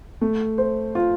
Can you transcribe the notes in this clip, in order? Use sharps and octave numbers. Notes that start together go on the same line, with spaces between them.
A3
C5
F4